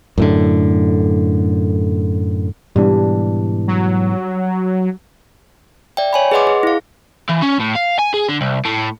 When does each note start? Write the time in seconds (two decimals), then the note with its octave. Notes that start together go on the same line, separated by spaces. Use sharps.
0.18 F#2 A2 D3
2.76 G#2 B2 E3 G3 D4
3.67 F#3
5.97 D5 E5 G5
6.13 C#5 G#5 B5
6.31 G#4 B4 D#5 F#5 C6 D6
6.47 G#4
6.63 E4 F5
7.29 E3
7.42 C#4
7.60 A2
7.75 F5
7.99 G#5
8.14 G#4
8.29 D3
8.41 C2
8.65 A2